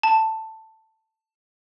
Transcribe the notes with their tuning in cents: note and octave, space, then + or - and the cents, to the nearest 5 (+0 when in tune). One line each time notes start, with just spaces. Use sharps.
A5 +10